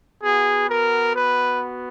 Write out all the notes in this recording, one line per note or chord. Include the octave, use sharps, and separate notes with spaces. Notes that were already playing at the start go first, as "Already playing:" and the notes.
B3 F#4 G#4
A#4
B4